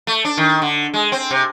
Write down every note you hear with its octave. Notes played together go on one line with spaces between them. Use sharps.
A3
D4
D#3
D3
G#3
C4
C3